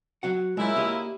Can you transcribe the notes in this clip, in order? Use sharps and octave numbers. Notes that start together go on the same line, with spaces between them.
F#3 F#4 F#5
A#2 C#3 G#3 E4
A#3 G4 D#5